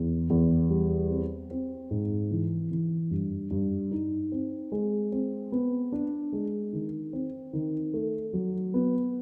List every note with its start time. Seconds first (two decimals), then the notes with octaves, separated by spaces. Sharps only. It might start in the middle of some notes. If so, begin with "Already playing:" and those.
Already playing: E2
0.30 E2
0.69 G3
1.09 C4
1.51 C4
1.91 G#2
2.31 E3
2.71 E3
3.11 G2
3.51 G2
3.91 D#4
4.32 C4
4.72 G#3
5.12 C4
5.52 B3
5.92 D4
6.33 G#3
6.73 D#3
7.13 C4
7.53 D#3
7.94 A3
8.33 F#3
8.74 B3